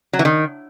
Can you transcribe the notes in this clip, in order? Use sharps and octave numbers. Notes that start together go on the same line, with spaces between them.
F#3
E3
D#3